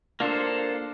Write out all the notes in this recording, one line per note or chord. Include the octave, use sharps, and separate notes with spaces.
A#3 D4 F4 A4 C5